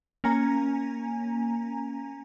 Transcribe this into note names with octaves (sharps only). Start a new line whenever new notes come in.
A#3 C#4 G#5 A#5